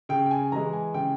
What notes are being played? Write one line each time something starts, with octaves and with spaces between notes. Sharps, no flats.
C#3 G5
G5
G#5
E3 G#3 A#5
G#5
C#3 G5